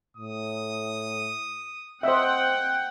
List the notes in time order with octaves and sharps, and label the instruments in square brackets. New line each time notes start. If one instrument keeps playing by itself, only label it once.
[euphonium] A2 [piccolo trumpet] D#6
[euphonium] C4 [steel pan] C5 D#5 E5 [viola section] F#5 G5